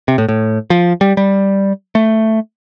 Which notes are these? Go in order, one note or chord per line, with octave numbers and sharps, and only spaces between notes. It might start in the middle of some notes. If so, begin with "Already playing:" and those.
C3
A2
A2
F3
G3
G3
A3